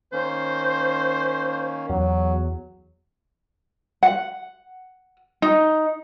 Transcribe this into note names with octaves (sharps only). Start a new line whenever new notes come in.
D#3 A#3 C#4 C5
E2 F#3
F#5
D#4